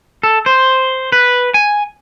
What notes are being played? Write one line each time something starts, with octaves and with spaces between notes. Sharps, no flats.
A4
C5
B4
G#5